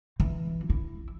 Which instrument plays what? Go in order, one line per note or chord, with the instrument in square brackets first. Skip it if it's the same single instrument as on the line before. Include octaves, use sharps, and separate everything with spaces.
[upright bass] E3
E4